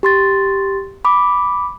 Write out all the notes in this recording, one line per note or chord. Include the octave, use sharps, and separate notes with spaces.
G4 C6 A6
B5 D6